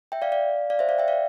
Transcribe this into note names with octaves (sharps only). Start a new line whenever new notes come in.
E5 G5
D5 F5
D5 F5
D5 F5
C5 E5
D5 F5
E5 G5
D5 F5